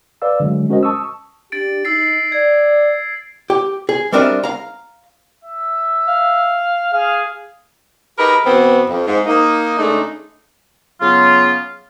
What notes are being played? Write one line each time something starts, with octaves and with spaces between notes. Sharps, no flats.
B4 D5 F5 E6
D3 F#3 G#3
G#3 C#4 F#4 A#4 C5 D#5
A5 C#6 D#6 E6
D4 G4 A6 D7
D#4 E6 A6 C7
D5 G#6
G4
G#4
G3 C4 D4 A#4 D#5 E5
F5 A#5
E5
F5
G#4 F5
D#4 G4 G#4 A#4 B4
B2 E3 B3 C4
F2
G#2
A#3 D#4
C#3 G#3 A3 D4 D#4
C#3 F#3 B3 F4